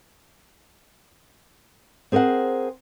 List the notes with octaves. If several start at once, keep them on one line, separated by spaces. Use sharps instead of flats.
C4 G#4 A#4 C5 F#5